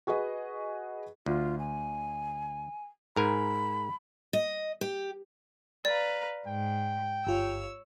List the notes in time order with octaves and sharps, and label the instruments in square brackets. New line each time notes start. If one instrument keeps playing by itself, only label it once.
[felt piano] F#4 G#4 B4 D#5
[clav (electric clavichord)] D2 [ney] F4
[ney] G#5
[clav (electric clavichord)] G#2 A#4 G#5 [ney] B5
[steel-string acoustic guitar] D#5
G4
[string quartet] B4 F5 A#5 [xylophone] D5
[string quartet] G#2 [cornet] G5
[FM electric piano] G1 F4 [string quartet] C#5 E6